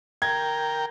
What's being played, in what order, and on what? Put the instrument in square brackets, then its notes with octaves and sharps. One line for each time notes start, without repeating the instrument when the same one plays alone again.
[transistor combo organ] A#4 G5 [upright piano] G#6